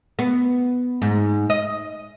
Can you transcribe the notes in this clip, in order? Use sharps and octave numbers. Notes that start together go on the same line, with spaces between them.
B3
G#2
D#5